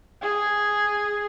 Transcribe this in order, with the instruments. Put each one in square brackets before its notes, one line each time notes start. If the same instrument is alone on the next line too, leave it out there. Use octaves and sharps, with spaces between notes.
[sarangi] G#4